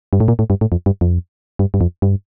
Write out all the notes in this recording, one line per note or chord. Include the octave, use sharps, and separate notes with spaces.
G2
A2
A#2
A2
G2
A2
F2
G2
F2
G2
G2
F2
G2